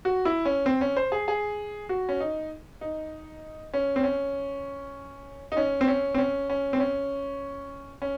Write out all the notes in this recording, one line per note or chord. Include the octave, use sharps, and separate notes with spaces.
F#4
E4
C#4
C4
C#4
C5
G#4
G#4
F#4
C#4
D#4
D#4
C#4
C4
C#4
D#4
C#4
C4
C#4
C4
C#4
C#4
C4
C#4
C#4